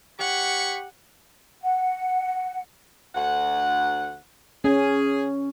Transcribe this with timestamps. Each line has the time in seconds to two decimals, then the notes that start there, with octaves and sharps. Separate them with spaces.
0.19 G4 C#5 F#5 B5 C#6
1.62 F#5
3.15 D2 F#5
4.64 C#4 G#4